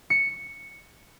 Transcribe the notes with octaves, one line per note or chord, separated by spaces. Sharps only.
C#7